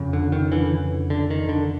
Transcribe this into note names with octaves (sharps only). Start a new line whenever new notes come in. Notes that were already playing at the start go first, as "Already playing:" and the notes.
Already playing: F2 C#3
D3
D#3
D3 E3
D3
D#3
D3